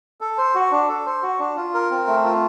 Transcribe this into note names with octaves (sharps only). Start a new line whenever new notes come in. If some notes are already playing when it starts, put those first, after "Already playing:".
A4
C5
F#4
D4
A4
C5
F#4
D4
F4
A#4
C4
A3
F4